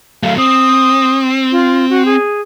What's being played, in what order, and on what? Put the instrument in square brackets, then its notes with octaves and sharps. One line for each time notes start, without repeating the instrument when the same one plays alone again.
[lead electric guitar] F#3 A3 [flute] F5
[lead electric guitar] C4 [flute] D#6
[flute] F4
F#4
G#4